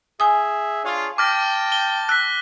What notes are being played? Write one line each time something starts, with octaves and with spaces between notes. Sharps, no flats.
G#4 E5 G#5 D#6
D4 F4 G#4 C#5
G5 A5 D6 F6 A#6
G7
E6 F#6 B6